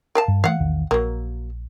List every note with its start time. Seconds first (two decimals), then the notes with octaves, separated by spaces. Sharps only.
0.15 A#4 F5 A5
0.28 G2
0.44 E3 A3 F5 F#5
0.59 A#1 E2 D#3
0.91 A#1 F#3 A#3